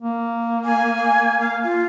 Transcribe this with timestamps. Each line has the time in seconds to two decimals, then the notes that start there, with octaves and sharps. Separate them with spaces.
0.02 A#3
0.65 G#5
1.40 F5
1.64 F4